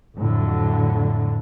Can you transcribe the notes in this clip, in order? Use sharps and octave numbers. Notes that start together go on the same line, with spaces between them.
F2 A2 D3 F#3